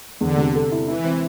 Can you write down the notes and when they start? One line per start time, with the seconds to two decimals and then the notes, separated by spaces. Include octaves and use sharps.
0.21 E2 D3
0.38 C3
0.55 A4
0.72 E4
0.88 E3 E4
1.04 C4